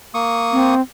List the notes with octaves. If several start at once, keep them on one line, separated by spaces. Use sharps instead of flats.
A#3 C#6 D#6
C4